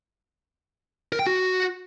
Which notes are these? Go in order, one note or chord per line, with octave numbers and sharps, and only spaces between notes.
A#4
G5
F#4